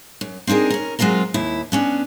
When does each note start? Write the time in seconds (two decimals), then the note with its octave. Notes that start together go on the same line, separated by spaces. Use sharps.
0.21 F#2
0.47 C4 D4 D#4 G#4 A#4
0.70 C#4 A#4
0.99 F#3 G#3 C4 F4 A#4
1.34 D#2 E4
1.72 B3 C#4 D4